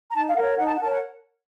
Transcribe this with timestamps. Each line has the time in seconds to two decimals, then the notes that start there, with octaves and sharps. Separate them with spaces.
0.11 A#5
0.15 D#4 A5
0.28 F5
0.36 A#4 C#5 F#5
0.58 D#4 F#5
0.67 A5
0.74 F#5
0.80 A#4 C#5 A5
0.90 F#5